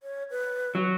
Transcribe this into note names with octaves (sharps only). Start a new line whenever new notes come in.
C#5
B4
F#3